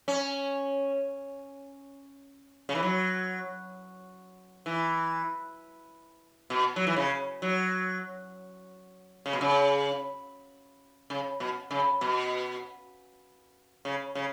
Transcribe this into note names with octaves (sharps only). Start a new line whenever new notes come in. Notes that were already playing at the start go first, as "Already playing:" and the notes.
C#4
C#3
E3
F#3
E3
B2
F#3
E3
C#3
F#3
C#3
B2
C#3
C#3
B2
C#3
B2
C#3
C#3